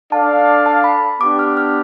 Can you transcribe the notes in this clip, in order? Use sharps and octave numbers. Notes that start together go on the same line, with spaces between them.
D4 A4 D5 F5 A5
A5
B5
B3 D4 G4 D6
F6
F6